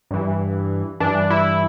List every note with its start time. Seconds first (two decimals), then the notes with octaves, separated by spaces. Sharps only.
0.11 G2 E3
1.00 G2 E3 D4
1.30 E4